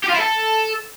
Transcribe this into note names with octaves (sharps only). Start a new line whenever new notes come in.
G4
F4
E4
A4